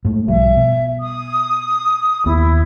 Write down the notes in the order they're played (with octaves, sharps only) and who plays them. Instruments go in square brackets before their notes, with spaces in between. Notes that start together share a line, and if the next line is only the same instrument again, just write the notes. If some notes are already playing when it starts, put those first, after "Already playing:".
[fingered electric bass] G#2 A3
[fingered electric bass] B1 F3 G3 [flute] E5
[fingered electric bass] B2
[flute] D#6
[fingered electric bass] D#2 B3 [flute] E4